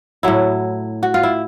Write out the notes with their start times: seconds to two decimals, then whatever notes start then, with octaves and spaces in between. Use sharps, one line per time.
0.23 A2 F#3 E4
1.03 F#4
1.14 F4
1.23 E4